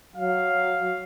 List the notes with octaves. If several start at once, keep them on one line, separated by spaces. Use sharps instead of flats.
F#3 F5